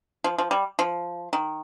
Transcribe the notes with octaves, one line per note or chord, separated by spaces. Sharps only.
F3
F3
G3
F3
D#3